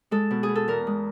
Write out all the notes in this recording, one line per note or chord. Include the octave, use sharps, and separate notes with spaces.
G#3 A4
B2
G#4
B3
A4
E2 A#4
G#3